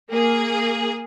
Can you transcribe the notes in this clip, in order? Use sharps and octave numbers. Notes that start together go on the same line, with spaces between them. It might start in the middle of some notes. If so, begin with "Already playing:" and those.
A#3 G#4